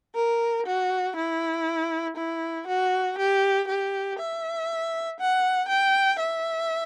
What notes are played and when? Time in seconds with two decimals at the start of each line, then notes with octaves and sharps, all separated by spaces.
0.15 A#4
0.66 F#4
1.16 E4
2.16 E4
2.67 F#4
3.18 G4
3.67 G4
4.19 E5
5.20 F#5
5.69 G5
6.19 E5